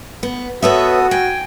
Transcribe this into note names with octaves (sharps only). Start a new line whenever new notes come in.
B3
B3 F#4 A4 B4 C#5 E5 D#6
G5 G#5